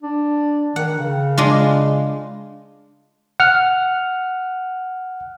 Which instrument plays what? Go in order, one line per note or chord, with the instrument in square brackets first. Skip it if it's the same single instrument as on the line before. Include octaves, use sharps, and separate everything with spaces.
[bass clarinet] D4
[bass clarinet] D#3 [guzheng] F#5
[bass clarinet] C#3
[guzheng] G#3 D4 F4
[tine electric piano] F#5 F6